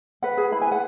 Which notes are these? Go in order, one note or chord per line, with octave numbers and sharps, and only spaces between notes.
B4 F#5
G#4
E4 B5
G#5
B4 F#5